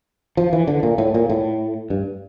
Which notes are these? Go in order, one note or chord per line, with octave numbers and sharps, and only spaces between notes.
F3
E3
D3
A#2
A2
A#2
A2
G2